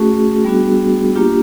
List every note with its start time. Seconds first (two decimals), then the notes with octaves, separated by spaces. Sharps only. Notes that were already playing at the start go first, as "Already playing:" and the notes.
Already playing: A3 C#4 F#4 G#4
0.45 G3 B3 D4 F#4
1.15 A#3 D4 F4 G4